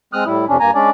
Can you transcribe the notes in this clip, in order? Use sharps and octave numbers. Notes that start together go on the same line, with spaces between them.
G#3 C4 D#6 F6 F#6
A2 G3 E4
F2 C3 C#4 D4
G2 A#3 G#5 A#5
G#3 C#4 D4 D5